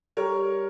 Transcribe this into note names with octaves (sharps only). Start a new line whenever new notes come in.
G3 A#4 C#5